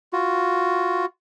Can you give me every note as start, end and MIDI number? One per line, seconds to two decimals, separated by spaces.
0.13 1.06 65
0.13 1.06 66